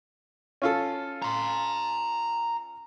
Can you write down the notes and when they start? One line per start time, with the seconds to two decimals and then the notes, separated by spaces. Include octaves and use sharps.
0.62 C#4 F4 A4
1.22 A#5 C6